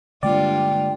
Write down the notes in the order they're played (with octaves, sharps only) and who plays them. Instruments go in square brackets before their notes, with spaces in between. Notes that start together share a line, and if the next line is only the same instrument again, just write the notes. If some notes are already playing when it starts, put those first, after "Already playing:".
[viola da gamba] G2 F4 [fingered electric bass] D3 G#3 A#3 [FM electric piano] D5 [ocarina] G5